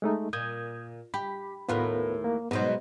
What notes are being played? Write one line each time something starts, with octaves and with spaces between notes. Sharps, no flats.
G#3 A3 D#4
A#2 D#6 G6 G#6
G4 B5
D#2 A2 B3 F4 A#4 B4
A#3
G#2 B2 F#3 B3 C5